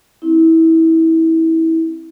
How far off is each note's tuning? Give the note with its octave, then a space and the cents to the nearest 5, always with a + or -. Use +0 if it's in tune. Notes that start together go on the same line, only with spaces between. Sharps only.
C4 +25 E4 -25